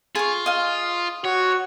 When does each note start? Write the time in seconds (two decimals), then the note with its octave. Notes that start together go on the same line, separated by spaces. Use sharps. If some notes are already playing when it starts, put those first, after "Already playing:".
0.15 F4 G#4 C#6
0.46 D#5 F5
1.25 F#4 C#5